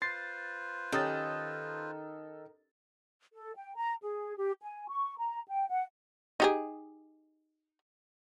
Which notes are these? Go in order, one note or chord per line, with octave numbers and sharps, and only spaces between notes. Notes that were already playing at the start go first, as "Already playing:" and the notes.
F4 B4 C5 C6 A6 C7
D#3 C#4 G4 A4 D#6 A6
A4
G5
A#5
G#4
G4
G#5
C#6
A#5
G5
F#5
D#4 G4 G#4